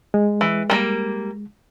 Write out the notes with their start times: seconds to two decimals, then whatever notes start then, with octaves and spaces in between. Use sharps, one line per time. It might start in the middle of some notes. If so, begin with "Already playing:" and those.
0.14 G#3
0.41 E3
0.70 G3 A3 A#3